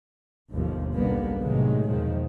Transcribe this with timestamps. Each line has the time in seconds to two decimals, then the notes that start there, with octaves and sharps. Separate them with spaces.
0.52 G1 D#2 B2 F3
0.93 F#1 B1 D3 G3 A#3 B3
1.41 A2 C3 D#3 F#3 G#3
1.89 E2 B2 D#3 F3 G#3